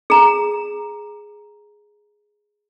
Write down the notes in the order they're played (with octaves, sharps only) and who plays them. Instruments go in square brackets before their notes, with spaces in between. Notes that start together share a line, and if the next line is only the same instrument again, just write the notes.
[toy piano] G#4 A#5